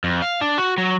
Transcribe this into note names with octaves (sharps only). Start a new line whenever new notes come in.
F2
F5
D4
F#4
F#3